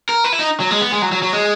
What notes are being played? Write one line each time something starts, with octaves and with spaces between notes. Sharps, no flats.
A#4
B4
E4
D#4
F#3
G#3
B3
G#3
F#3
F#3
F#3
G#3